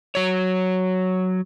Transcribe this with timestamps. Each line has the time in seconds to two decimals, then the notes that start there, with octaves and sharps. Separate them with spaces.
0.15 F#3 C#5